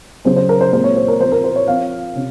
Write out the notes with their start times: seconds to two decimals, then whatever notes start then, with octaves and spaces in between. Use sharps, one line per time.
0.25 C#3 F#3 C#4 C5
0.36 C5
0.49 A#4
0.61 C5
0.72 A#2 G#3 C4 C5
0.84 C#5
0.96 C5
1.08 A#4
1.20 F3 C4 C5
1.32 A#4
1.44 C5
1.56 C#5
1.68 F3 C4 F5
2.15 C3 C#4